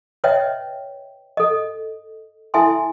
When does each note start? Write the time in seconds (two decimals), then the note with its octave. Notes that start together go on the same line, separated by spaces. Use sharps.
0.24 B4 C#5 D#5 E5 G5
1.37 A4 D#5
2.54 E4 A4 E5 G#5 A5 C6